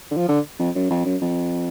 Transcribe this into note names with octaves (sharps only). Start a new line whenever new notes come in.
D3
F3
D3
F2
F#2
F2
F#2
F2